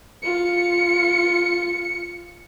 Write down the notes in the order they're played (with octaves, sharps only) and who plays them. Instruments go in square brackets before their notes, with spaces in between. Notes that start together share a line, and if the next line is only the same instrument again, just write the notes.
[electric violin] F4 C#7